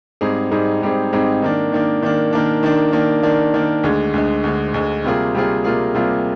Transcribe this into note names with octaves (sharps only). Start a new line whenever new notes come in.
G#2 G3 C4 D#4 G#4
G#2 G3 C4 D#4 G#4
G#2 G3 C4 D#4 G#4
G#2 G3 C4 D#4 G#4
D#3 A#3 D4
D#3 A#3 D4
D#3 A#3 D4
D#3 A#3 D4
D#3 A#3 D4
D#3 A#3 D4
D#3 A#3 D4
D#3 A#3 D4
D2 D3 G#3
D2 D3 G#3
D2 D3 G#3
D2 D3 G#3
C3 G3 A#3 F4 G#4
C3 G3 A#3 F4 G#4
C3 G3 A#3 F4 G#4
C3 G3 A#3 F4 G#4